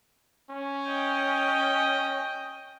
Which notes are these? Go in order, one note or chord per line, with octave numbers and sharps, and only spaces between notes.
C#4
D#5 G5